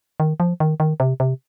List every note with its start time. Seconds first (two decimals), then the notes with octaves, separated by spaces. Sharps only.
0.20 D#3
0.40 F3
0.60 D#3
0.80 D#3
1.00 C3
1.20 C3